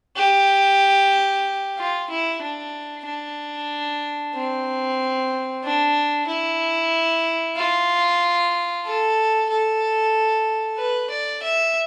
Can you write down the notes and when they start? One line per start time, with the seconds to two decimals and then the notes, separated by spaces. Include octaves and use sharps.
0.16 G4
1.78 F4
2.10 E4
2.42 D4
3.06 D4
4.35 C4
5.64 D4
6.27 E4
7.56 F4
8.85 A4
9.50 A4
10.78 B4
11.10 D5
11.43 E5